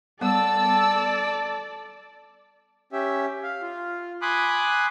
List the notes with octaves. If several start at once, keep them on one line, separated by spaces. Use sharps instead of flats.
G3 B3 A4 D5 A5 E6
C#4 G4 E5
F5
F4
G#5 B5 C6 D6 D#6 F#6